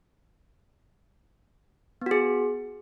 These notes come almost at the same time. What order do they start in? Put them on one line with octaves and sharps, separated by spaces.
B3 F#4 G#4